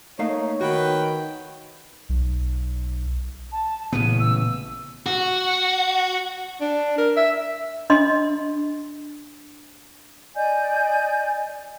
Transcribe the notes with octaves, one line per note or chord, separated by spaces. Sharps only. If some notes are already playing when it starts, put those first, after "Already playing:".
A3 A#3 D#4 C#5 F5
D#3 F#4 B4 G5
B1
A5
A1 A#2 C#3 B3 D#7
E6
F#4
D4
A#4
E5
D4 D#5 C6
D5 D#5 G#5 G6